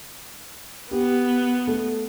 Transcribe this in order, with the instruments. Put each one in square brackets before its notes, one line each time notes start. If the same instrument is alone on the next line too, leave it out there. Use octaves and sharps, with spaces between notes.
[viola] B3 [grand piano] G4
[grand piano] A3